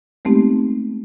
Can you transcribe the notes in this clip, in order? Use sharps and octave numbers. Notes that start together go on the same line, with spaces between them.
G#3 A3 B3 C4 D#4 G4